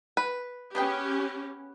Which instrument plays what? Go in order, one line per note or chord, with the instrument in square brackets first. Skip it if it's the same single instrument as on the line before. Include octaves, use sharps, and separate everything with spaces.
[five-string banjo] B4
[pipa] B3 G#4 G5 [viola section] C#4 G4